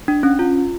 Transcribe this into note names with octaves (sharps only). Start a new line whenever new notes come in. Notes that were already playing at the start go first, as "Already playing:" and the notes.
D4
C#4
F4